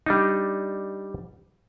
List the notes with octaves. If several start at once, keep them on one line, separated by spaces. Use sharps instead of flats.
G3 D4 D#4